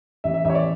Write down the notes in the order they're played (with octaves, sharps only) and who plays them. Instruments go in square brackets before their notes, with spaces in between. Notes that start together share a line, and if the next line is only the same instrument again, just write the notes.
[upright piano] A1 E5
E5
A1 E5
C#5
D5